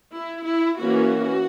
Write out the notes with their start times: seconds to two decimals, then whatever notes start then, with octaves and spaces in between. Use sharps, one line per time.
0.15 E4
0.47 E4
0.79 E3 A#3 C#4 F#4